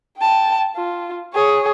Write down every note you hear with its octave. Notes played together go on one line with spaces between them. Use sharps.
G5 A5
F4
G#4 C#5